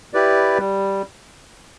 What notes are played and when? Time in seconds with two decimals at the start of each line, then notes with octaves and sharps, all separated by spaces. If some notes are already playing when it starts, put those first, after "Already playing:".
0.13 E4 G4 B4 D5
0.58 G3